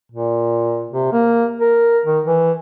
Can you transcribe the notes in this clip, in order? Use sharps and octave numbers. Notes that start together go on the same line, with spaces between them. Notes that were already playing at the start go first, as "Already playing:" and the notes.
A#2
C3
A#3
A#4
D#3
E3